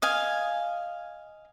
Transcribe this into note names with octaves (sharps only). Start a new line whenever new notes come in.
D#5 F5 G#5